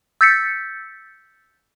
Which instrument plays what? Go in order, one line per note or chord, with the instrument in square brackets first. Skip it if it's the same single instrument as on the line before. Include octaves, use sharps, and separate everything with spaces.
[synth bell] E6 G6 A6 B6 C#7